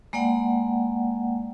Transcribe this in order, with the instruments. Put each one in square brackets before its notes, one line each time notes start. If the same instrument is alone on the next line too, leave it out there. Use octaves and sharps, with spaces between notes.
[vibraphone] G#3 A#3 D5 F#5 G5